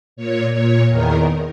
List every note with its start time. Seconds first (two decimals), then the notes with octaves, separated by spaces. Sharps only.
0.16 A#2 C#5
0.53 A#2 C#5
0.89 E2 D#3 A#4